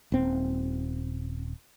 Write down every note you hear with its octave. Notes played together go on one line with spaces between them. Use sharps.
D#1 C4